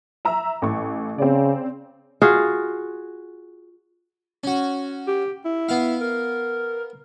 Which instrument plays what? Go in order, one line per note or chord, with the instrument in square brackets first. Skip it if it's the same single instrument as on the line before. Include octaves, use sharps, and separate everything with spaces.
[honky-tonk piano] E5 A#5 E6
A1 C#6
[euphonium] C#3 [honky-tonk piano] C4 D5
[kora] F4 F#4 G#4
[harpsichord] C#4 F#4
[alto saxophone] G4
E4
[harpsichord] B3 F5
[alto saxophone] A#4